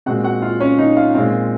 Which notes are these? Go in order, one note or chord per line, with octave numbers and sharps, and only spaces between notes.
A#2 G#3 C4 F#4 F#5
F#4 F#5
F4 F5
C#4 C#5
D#4 D#5
F4 F5
A#2 G#3 C4 F4 F5